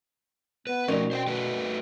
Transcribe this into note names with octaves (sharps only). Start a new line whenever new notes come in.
B3 B4
B2 F3 A3 C#4 D#4 A#4 D5
C5 F5 G5
A3 F#4 B4